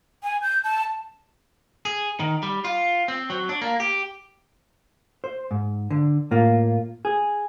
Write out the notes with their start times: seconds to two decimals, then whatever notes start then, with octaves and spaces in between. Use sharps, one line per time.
0.23 G#5
0.42 G6
0.64 A5
1.85 G#4
2.20 D#3
2.43 G3
2.64 F4
3.08 C4
3.30 F#3
3.49 D4
3.62 A#3
3.80 G4
5.24 C5
5.51 G#2
5.91 D3
6.31 A2 A#3 F4
7.05 G#4